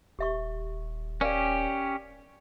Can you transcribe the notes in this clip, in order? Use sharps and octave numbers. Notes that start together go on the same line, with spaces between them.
D#1 G4 E5 C#6
C#4 G4 A#4 D5 F5